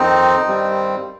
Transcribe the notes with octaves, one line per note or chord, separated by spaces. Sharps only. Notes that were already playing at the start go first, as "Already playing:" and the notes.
Already playing: F2 D#3 C4 D#4
G2 D#3 G3 C4